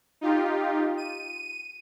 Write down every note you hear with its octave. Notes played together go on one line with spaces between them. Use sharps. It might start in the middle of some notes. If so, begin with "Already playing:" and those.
D#4 F4 G4
D#7